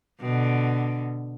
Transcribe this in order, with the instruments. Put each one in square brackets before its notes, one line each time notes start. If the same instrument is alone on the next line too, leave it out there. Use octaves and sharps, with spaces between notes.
[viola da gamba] B2 D3